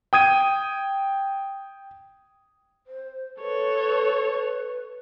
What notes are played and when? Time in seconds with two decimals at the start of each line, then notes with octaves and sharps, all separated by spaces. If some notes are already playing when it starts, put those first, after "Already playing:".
0.13 G5 D#6 G#6 D#7
2.87 C5
3.41 A4 B4 C#5
3.75 B4